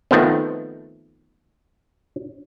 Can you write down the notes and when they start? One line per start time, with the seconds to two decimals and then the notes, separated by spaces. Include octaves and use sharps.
0.11 D#3 F3 A3 B3 C4